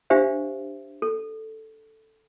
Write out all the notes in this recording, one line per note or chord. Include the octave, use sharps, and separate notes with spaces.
D4 G4 C5 E5 F5
A4